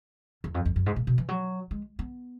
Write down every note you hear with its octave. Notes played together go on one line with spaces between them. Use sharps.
E2
F2
F2
F#2
G#2
A#2
B2
E3
F#3
G#3
B3